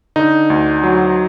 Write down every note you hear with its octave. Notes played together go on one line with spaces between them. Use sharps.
D3 D#4
D2
F#3